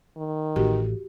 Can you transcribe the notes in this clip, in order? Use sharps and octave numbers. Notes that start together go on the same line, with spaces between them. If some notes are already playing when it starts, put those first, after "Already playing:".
D#3
A1 F#4 G4